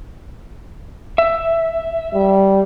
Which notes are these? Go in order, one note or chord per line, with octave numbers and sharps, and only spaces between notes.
E5
G3